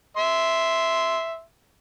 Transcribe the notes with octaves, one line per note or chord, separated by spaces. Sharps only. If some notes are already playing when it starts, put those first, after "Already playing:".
E5 C6